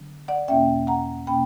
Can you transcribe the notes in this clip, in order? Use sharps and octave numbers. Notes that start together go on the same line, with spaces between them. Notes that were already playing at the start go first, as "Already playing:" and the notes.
Already playing: D3 F#3 B3 D4
D5 F#5
E2 B2 A#3 C#4 E5 G5
F#5 A#5
B2 A#3 C#4 G5 B5